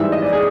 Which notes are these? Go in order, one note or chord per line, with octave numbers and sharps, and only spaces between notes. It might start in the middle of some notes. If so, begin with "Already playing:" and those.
Already playing: G#2 E3 G3 E5
D#5
D5
G#4